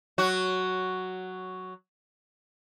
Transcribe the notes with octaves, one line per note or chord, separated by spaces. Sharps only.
F#3 F#4